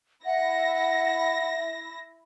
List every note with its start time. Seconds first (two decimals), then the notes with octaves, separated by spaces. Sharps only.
0.25 E4 E5 F#5 A#6